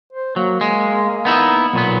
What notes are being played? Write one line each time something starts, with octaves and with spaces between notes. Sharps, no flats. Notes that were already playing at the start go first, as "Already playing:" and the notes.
C5
F#3 A#3
G#3
B3 D#4 E4
B1 A#2 B3